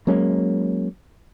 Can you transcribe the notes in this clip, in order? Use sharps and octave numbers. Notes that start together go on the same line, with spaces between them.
F#3 G#3 A#3 C#4